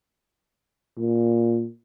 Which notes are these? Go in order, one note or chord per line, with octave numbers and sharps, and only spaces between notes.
A#2